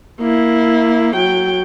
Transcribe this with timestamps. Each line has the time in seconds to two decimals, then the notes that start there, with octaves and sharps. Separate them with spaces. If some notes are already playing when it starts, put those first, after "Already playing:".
0.20 A#3 E4
1.16 F#3 G5